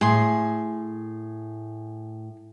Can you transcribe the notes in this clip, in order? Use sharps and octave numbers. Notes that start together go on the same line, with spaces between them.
A2 G#4 C6